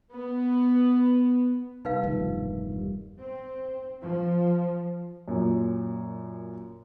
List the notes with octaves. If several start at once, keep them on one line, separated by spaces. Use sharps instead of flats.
B3
C3 G3 D#4 B4 E5 F5
E1 G2 D#3 F3 A3 A#3
G3
C4
F3
F#2 A#2